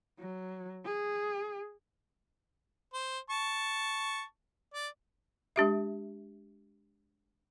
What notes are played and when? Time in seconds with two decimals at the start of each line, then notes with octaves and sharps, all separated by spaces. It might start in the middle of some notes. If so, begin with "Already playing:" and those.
0.19 F#3
0.85 G#4
2.94 C5
3.30 A5 C#6
4.74 D5
5.56 G#3 D4 G4 E5